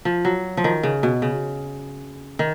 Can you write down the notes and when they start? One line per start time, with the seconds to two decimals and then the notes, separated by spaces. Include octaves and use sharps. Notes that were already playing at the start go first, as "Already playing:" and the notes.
0.05 F3
0.25 F#3
0.57 F3
0.64 D#3
0.83 C#3
1.03 B2
1.22 C#3
2.39 D#3